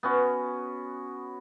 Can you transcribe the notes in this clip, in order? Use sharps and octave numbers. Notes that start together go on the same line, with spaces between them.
B3 C#4 F#4